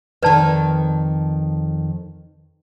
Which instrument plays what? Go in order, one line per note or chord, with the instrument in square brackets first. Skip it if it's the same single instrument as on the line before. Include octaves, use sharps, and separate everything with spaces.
[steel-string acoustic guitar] F2 D#3 [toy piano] B4 D5 A5